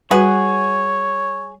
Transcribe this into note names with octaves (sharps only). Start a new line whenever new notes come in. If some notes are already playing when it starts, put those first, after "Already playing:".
G3 F#4 G#4 B4 C#5 F#5